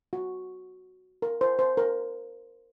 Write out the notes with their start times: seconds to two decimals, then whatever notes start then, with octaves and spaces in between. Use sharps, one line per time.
0.13 F#4
1.22 A#4
1.41 C5
1.59 C5
1.77 A#4